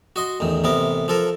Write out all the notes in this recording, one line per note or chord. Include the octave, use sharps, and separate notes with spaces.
F#4 D#5 C6
A1 E2 D#3
A1 C3 B3 A#4
F3 A4 A#4